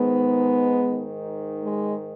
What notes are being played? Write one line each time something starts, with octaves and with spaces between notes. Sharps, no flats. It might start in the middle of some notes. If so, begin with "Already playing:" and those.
Already playing: G#2 D#3 G#3 B3
G#2 D#3
G#3